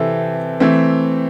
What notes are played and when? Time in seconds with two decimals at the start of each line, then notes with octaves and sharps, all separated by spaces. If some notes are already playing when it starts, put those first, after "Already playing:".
Already playing: C3 E3 C4 E4 A4
0.60 E3 A3 C4